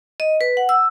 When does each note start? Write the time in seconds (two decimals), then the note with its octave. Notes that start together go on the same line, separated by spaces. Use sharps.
0.20 D#5
0.41 B4
0.57 F#5
0.69 E6